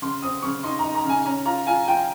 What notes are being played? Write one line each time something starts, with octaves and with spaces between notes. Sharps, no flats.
C#3 C6
C4 D#6
C#3 C#6
D#4 C6
A#5
D#4
A#5
C#3 G#5
C#4 A#5
F4 A#5
F4 G#5
F4 G5